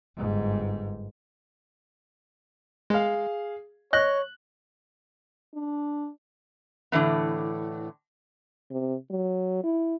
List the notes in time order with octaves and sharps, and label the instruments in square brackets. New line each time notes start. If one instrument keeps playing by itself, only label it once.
[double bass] G1 G#2
[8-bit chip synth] G#3 [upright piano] G#4 F5
[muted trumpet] C#5 [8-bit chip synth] D#5 A#6 [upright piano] F#6
[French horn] D4
[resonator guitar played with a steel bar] A2 D3 E3 B3
[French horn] C3
F#3
E4